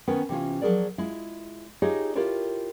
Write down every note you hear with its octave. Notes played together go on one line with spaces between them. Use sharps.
D#3 B3 C#4 A#4 B4
C3 E3 C#4 F4
F3 F#3 G#3 G#4 A#4 D5
G#3 E4 F4
D#4 F4 G4 G#4 C#5 D#5
E4 F4 G4 A4 A#4 C#5